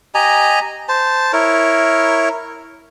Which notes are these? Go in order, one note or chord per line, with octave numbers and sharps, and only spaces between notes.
G4 D#5 G#5 A#5
C5 A5
E4 A#4 C#5